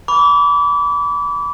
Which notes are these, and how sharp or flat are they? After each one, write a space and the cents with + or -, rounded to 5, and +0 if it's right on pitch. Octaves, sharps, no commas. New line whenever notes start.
B5 +0 D6 -35